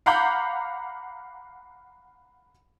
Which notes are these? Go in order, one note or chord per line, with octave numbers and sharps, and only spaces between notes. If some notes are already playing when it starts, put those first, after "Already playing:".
F5 F#5 A#5 B5 D6 G6